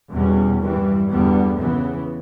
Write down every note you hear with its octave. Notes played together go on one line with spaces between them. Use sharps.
E2 B2 G3 C#4
G2 E3 G3
E2 D3 G3 B3
C#3 E3 B3